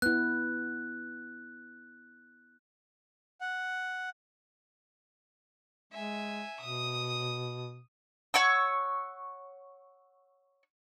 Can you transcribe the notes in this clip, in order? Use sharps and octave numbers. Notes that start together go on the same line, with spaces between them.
B3 E4 F#6
F#5
G#3 E5 G#5
B2 D#6
C#5 F#5 C#6 E6